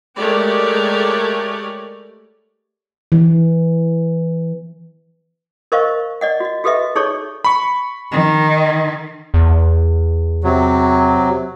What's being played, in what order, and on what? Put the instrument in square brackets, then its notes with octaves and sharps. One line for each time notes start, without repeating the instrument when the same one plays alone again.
[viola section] G#3 A3 G4 A#4 C#5 D5
[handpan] E3
[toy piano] A#4 C5 D#5 F5 C#6
D5 D#5 F#5
F#4 D#5
F#4 G4 A4 B4 D#5 E5
D#4 G#4 A4 C#5 D5 C#6
[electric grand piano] B5 C#6
[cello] D#3
[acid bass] E2
[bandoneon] C3 F#3